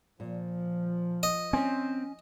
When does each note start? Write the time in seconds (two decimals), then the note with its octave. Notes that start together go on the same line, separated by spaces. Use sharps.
0.20 A#2 F3
1.23 D#5
1.53 C4 C#4 G#5